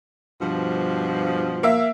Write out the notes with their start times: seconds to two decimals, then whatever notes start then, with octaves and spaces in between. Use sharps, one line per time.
0.41 G2 B2 F3
1.63 A#3 E5